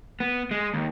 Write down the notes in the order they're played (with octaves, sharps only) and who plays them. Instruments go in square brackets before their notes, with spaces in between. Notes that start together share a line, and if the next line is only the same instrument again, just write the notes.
[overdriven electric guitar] B3
G#3
D#2